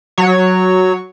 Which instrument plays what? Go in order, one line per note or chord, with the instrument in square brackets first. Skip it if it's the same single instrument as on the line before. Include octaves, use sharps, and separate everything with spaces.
[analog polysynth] F#3 C#5